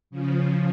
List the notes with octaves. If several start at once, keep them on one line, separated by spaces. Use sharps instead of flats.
C#3 F3